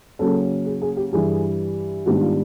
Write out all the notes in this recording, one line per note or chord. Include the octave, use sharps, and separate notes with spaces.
C#3 F#3 A#3 C#4 A4
G#4
G#4
G4
G2 E3 G3 G#4
G#2 D#3 G3 B3 D4 F#4
F4